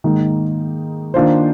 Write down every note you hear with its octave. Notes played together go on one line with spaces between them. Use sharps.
G#2 D#3 A#3 D#4
D#3 A#3 D4 F4 C5